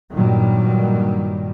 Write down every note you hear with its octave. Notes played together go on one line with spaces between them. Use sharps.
G2 A#2 D#3 F#3 G3